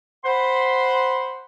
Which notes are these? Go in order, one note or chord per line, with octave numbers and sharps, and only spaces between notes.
C5 F#5 B5 C6